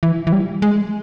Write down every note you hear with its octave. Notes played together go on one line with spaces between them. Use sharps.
E3
E3
G3
G#3